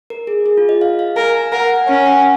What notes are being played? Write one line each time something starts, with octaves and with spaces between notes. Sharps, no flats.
A#4
G#4
G#4
F4
D#5
F5
F5
A#4 G#5
A#5
A#4 F#5
F#5
G#5
C#4 G#5
F#5